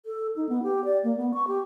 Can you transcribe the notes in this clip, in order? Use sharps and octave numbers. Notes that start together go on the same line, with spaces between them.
A4
D#4
B3
G4
D5
A#3
B3
C#6
G4